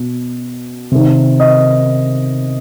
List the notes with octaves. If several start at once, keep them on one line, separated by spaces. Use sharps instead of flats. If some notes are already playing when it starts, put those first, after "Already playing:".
Already playing: B2
C3 D#3
D#5